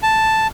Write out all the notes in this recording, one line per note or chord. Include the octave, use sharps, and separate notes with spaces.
A5